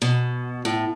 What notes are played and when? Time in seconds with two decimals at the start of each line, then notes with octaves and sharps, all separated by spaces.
0.02 B2
0.65 A2